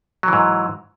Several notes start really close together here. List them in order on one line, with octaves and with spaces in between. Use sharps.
F#3 E3 G#2